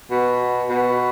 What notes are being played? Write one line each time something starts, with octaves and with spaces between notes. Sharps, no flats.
B2
B2